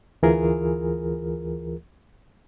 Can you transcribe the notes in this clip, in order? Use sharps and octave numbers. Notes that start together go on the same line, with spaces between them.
D2 E3 F4 G#4 A#4